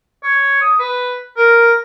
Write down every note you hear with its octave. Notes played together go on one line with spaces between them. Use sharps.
C#5
D#6
B4
A#4